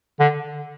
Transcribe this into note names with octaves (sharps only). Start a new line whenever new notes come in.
D3